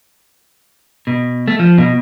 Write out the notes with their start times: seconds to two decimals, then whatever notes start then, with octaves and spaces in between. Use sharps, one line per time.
1.07 B2
1.48 A3
1.59 F3
1.78 B2